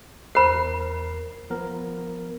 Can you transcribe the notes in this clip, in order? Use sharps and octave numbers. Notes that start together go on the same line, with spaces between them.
E2 A#4 C5 B5 C7
F3 B3 A#4